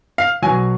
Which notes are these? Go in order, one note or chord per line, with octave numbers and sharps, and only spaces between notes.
F5
B2 F#3 G#5